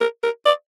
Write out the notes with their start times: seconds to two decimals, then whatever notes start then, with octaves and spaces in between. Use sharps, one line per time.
0.01 A#4
0.23 A#4
0.46 D5